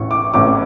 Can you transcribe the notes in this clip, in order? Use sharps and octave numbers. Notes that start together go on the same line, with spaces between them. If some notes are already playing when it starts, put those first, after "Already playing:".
Already playing: A1 A2 E3 C#6
D6
A1 A2 E3 D6